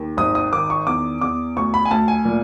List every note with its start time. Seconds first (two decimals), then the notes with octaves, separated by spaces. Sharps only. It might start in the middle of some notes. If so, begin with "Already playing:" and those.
Already playing: D#2
0.17 G#1 D#6
0.35 D#6
0.52 D#3 D6
0.70 C#6
0.87 E2 D6
1.21 E2 D6
1.56 D2 C#6
1.74 B5
1.85 G#5
1.91 D2 A5
2.08 G#5
2.25 A#2